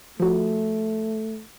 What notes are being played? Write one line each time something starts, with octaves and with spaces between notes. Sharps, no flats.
F3 A3 F#4